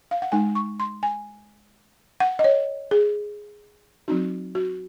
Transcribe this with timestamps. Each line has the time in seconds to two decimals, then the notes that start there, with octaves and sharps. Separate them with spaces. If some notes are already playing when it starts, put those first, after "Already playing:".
0.11 F5
0.22 F#5
0.32 G#3 D#4 G#5
0.55 C#6
0.80 C6
1.03 G#5
2.20 F#5
2.39 D#5
2.44 C#5
2.91 G#4
4.08 F#3 C4 D#4 F#4
4.55 F#4